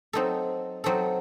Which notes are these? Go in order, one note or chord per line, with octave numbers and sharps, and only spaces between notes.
F#3 C4 D#4 A4
F#3 C4 D#4 A4